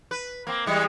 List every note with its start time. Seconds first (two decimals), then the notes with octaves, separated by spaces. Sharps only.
0.11 B4
0.47 A#3 C4
0.66 E3 G3 G#3